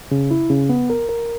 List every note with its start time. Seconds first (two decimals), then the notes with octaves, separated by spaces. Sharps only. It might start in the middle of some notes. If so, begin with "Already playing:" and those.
0.11 C#3
0.31 E4
0.50 C#3
0.69 B3
0.90 A#4
1.09 A#4